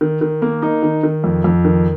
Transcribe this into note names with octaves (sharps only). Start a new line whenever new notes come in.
D#3
D#3
A#3
D#4
D#3
D#3
F2
F2
D#3